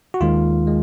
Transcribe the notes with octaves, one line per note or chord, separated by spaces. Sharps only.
F#4
D#2 D#3 G#3 F4
G#3